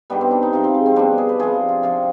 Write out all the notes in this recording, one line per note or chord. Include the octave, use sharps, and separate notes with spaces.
G2 D#3 G3 B3
C4
D4
D#4
C3 F3 D#4
C4
G#3
C4
B2 G3 D4
G#4
B4
C3 F3 G#4
G#4
F4
C3 F3 F4